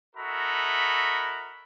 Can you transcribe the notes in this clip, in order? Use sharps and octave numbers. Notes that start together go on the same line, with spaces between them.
E4 F#4 A4 A#4 D#5 B5